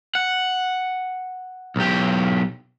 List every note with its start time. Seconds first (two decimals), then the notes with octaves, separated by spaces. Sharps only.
0.15 F#5
1.76 B1 G4